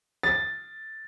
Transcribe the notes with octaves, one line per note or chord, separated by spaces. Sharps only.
A6